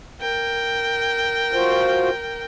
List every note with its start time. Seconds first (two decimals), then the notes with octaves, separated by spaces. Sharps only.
0.21 A#4 G5
1.53 F4 F#4 C5